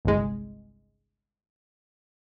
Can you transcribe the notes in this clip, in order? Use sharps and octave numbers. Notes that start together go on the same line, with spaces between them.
G1 C2 G#3